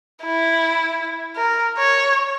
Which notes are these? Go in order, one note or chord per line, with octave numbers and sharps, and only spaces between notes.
E4
A#4
C#5